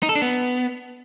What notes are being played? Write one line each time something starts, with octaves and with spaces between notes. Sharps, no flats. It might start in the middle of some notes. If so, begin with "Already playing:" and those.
D#4
A4
D4
B3